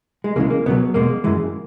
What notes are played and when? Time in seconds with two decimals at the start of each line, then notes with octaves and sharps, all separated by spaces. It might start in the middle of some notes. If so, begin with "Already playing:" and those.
0.24 G#3
0.36 C#2 C#3 E3 G#3 A#3
0.50 A#3
0.66 C#2 B2 F#3 B3
0.94 E2 B2 G#3 A#3
1.24 F#2 E3 G#3